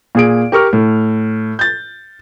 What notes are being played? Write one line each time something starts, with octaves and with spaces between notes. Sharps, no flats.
A#2 G#4 D7
G4 A#4 C#6 F6
A2
G6 A6